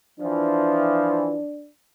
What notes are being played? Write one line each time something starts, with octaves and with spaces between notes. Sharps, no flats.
E3 F3 D4